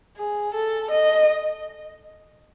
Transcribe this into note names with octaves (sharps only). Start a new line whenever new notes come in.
G#4
A4
D#5